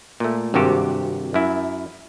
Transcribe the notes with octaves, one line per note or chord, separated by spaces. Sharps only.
A#2 A3
G#1 G2 C3 F#4 G4
F#2 E4